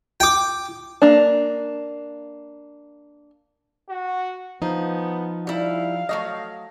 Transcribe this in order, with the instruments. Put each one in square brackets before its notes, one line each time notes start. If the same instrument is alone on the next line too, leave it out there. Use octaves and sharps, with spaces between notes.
[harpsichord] G5 D6
[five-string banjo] A#3 D4
[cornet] F#4
[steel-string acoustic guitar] F3 D#4 [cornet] B3
[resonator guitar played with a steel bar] G3 E4 [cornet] F5
[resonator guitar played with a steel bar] F#3 A3 D#5